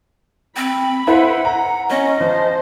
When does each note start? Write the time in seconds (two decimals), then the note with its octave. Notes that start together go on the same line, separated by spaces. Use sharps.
0.57 C4 B5
1.07 E4 B4 C5 F#5
1.45 A#5
1.89 C#4 D#5
2.20 F3 C5